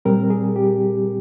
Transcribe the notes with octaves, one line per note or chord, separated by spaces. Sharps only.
A#2 G3 C4 A#4
G#4
G4